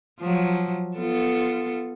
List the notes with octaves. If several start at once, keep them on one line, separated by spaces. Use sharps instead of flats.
F3 F#3
B3 F4 A4